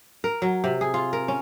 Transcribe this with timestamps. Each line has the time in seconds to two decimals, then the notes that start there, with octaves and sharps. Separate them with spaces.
0.24 A#4
0.42 F#3
0.64 C3
0.81 G#4
0.94 F4
1.13 A#4
1.28 C#4